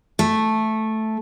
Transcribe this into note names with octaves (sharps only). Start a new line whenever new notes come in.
A3